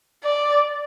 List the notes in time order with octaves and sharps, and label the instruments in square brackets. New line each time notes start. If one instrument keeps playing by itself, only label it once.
[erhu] D5